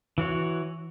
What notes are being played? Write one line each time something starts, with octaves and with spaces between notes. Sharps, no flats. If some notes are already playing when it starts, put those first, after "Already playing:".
E3 F#4 C#5